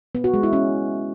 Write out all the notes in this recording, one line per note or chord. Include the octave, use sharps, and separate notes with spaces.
B3
F#4
G#3
E4
C#4